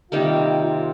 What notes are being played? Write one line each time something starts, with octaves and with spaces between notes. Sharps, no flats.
C3 D#3 G3 A#3 F4
F4